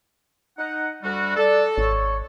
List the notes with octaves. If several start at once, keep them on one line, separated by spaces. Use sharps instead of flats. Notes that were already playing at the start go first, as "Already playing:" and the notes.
D#4 F#5
D2 G3 F#4
A4 D5
G#1 C#5